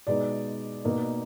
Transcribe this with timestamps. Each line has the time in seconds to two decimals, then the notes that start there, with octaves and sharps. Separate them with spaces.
0.07 B2 G#3 D#4 D5
0.85 B2 A#3 D#4